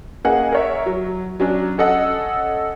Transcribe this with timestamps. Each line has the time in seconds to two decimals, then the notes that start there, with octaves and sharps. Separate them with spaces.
0.25 A#3 C#4 G#4 D#5 F#5
0.52 A#4 C#5 E5
0.86 F#3
1.40 F#3 C#4 D4
1.78 C#4 A4 D#5 F#5